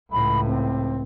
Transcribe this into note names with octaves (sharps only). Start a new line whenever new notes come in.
C#2 A2 B5
C4